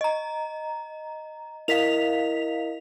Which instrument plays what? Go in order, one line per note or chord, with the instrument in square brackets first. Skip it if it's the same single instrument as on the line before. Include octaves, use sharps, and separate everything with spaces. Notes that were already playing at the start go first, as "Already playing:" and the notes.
[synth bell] D#5 A#5
[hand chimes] E4 A#4 D#5 [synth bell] F5 B6 F7